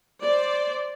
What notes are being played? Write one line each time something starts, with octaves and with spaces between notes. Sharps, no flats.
C5 D5